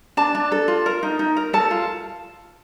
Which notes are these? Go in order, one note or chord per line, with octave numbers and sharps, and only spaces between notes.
D4 A5
D4
A4
F4
A#4
D#4
D#4
A#4
A4 A5
F4